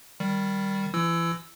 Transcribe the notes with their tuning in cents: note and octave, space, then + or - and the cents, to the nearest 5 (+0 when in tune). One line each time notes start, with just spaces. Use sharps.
D#3 -5 G3 +0
E3 +30 E4 +35 E6 +0